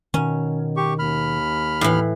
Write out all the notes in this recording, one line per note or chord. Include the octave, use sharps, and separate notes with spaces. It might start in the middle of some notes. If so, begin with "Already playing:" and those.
B2 D#3 C#4
G4 C#6
D#2 B5 F6
A2 E3